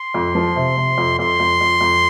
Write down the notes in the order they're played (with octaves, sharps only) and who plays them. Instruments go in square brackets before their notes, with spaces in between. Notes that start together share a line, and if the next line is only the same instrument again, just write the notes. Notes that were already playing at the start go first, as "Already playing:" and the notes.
Already playing: [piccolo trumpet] C6
[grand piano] F2
F3
C3
C3
F2
[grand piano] F2 [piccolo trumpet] C6
[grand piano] F2
F2
F2